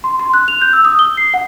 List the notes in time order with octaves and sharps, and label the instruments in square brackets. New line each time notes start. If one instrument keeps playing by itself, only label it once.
[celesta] C6
C6
F#6
F7
G6
E6
D#6
G7
C7
F#5